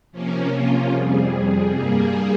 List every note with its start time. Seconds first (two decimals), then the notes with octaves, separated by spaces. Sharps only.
0.12 C3 F3 A#3 C#4
0.51 F4
0.92 F2 C3 G3 G#4
1.72 G2 G3 A#3 G#4